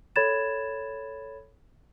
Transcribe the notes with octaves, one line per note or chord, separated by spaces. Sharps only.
A4 C#5 B5 G#6 A6 E7